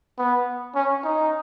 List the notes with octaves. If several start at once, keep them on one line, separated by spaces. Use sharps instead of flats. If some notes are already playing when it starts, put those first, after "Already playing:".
B3
C#4
D#4